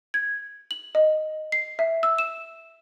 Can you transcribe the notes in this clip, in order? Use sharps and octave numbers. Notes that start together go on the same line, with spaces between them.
G#6
F#7
D#5
C7
E5
E6
E7